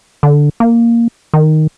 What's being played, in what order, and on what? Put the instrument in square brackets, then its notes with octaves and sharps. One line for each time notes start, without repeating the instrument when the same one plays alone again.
[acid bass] D3
A#3
D#3